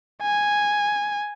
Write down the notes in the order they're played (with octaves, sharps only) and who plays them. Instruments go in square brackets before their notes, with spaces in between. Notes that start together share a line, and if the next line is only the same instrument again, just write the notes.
[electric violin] G#5